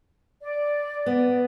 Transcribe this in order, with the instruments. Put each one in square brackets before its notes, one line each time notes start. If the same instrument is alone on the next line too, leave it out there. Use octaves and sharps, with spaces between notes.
[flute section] D5
[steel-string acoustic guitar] B3